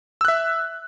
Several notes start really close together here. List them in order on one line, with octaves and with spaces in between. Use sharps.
E6 F#6 E5